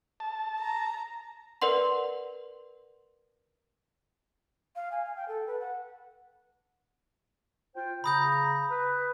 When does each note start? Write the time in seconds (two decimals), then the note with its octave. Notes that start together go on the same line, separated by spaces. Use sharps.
0.20 A5
0.60 A#5
1.62 A#4 B4 D5 F#5 C6
4.76 F5
4.92 G#5
5.05 F5
5.16 G5
5.28 A4
5.47 B4
5.60 F#5
7.75 F4 C5 G5
8.04 C#3 A#5 B5 D#6 G6
8.70 B4